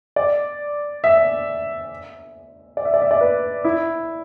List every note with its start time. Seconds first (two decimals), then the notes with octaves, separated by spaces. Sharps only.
0.16 D5
1.04 E5
2.77 D5
2.85 E5
2.94 D5
3.02 E5
3.11 D5
3.20 B4
3.64 E4